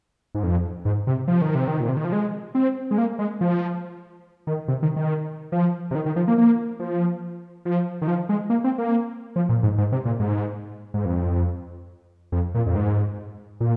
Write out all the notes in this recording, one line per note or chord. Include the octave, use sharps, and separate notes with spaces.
G#2
F2
G#2
C3
F3
D#3
C3
D#3
A#2
C3
D#3
F3
G#3
C4
G#3
A#3
G#3
F3
D#3
C3
D#3
D#3
F3
C3
D#3
D#3
F3
A#3
A#3
F3
F3
D#3
F3
G#3
A#3
C4
A#3
F3
A#2
G#2
G#2
C3
A#2
G#2
G#2
F2
F2
A#2
F2
G#2
A#2